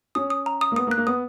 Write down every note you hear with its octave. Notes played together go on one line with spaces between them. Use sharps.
C#4 D#6
D#6
A#5
D#6
A#3
B3 D#6
A#3
F#6
A#3
B3 D#6